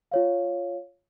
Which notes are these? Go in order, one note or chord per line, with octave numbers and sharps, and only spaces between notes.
F4 C#5 F5